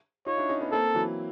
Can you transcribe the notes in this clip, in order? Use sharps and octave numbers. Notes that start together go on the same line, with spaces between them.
D#4 F4 C#5
D4 E4
C#4 D#4
B3 C#4
A#3 C4 A4
E3 F#3